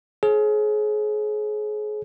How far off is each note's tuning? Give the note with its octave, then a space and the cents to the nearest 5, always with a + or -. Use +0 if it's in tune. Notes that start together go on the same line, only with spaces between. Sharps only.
G#4 +30 C#5 -40